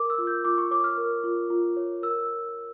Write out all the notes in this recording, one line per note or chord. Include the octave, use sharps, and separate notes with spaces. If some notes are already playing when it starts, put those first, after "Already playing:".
Already playing: A#4 D6
E6
F4
G6
F4 D6
C#6
C#5 D6
F6
A#4
F4
F4
C#5
A#4 E6